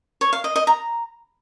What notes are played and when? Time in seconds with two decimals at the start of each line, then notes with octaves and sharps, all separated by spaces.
0.21 C#5
0.33 F5
0.44 D#5
0.56 D#5
0.67 A#5